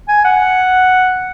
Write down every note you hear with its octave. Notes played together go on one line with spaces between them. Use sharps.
G#5
F#5